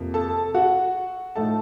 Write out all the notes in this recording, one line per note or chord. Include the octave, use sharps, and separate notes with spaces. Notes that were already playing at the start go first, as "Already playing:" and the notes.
Already playing: F2 C3 F3 A#3
A4 A5
F#4 F#5
A2 F3 A3 D#4 A4 A5